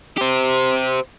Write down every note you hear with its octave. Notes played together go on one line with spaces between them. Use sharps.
G4 C5